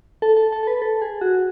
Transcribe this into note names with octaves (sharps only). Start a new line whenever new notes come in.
A4
A4
A4
A4
B4
A4
G#4
F#4